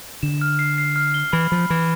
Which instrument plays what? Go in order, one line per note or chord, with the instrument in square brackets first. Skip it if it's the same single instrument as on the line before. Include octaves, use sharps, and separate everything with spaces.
[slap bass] D3 [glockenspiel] E7
[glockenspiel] F6
C7
C7
F6
G7
[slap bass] E3 [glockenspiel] B5
[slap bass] F3 [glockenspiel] B5
[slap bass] E3 [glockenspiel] B5